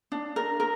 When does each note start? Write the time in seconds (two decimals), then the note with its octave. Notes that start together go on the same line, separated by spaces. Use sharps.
0.12 D4
0.36 A#4
0.60 A#4